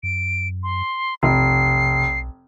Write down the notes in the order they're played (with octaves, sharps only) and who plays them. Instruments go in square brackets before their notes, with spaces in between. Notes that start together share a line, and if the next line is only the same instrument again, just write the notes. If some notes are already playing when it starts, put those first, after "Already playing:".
[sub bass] F#2 [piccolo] D7
[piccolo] C6
[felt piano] F1 [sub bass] B1 [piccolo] C7